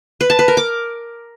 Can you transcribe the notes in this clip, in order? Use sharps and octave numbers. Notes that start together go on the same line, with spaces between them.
B4
A5
B4
A#4
D6